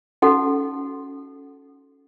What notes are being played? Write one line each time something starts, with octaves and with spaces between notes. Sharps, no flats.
C#4 D#4 F#4 A4 F#5